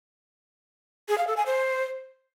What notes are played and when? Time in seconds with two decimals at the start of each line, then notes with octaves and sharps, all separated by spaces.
1.08 G#4
1.18 F5
1.27 A4
1.37 G#5
1.46 C5